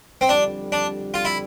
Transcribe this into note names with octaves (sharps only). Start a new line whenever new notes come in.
C4
F2 D3 G3 D4
D4
F4
E4